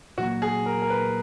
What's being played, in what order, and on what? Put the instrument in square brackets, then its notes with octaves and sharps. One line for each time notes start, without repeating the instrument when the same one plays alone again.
[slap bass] A#2 F#3 A#3 [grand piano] F#4
[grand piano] G#4
A#4
A#4
B4